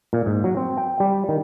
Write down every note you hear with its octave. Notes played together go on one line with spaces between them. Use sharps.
A#2
G#2
F#3
C4
G5
G3
D#3